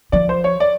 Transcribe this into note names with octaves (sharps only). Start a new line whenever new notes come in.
F3 D5
C5
C#5
D5